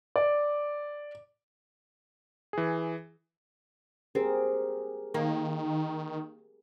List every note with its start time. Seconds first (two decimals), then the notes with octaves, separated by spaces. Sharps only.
0.16 D5
2.53 E3 G#4
4.15 C4 G4 G#4 A#4
5.14 D#3 A#3